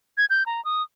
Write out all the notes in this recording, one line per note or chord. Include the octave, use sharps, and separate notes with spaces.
G#6
G6
A#5
D#6